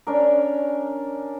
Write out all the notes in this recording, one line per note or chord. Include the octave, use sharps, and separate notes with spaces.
C#4 D4 A#4